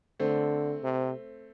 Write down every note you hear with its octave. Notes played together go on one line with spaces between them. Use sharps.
D3 A3 C4
C3